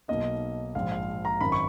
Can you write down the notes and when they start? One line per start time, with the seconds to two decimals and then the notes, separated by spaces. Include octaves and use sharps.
0.08 B1 B2 A#3 D#4 D#5
0.75 A#1 G#2 F3 F5
0.92 F5
1.25 A#5
1.41 G#1 F#2 D#3 B5
1.52 C#6